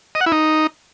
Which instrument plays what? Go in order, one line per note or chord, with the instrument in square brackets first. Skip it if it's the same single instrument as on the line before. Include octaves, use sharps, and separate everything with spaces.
[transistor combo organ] D#5
F#5
E4
D#4